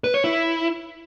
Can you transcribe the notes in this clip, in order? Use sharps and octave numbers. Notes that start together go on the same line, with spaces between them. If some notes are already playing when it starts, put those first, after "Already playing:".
B4
C#5
E4